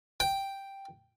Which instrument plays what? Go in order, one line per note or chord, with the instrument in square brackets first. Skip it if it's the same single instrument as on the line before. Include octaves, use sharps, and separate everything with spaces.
[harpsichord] G5